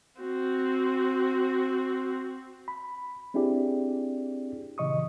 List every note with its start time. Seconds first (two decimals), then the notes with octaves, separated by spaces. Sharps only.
0.21 C4 F#4
2.68 B5
3.34 C4 D4 E4 G4 G#4 D5
4.78 A#2 C#3 E3 D#5 C#6 D#6